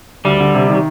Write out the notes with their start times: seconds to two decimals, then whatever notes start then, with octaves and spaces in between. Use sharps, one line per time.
0.25 D2 G3
0.40 D3
0.55 C3
0.70 D#3